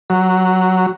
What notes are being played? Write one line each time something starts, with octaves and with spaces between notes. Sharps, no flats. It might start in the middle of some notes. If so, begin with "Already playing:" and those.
F#3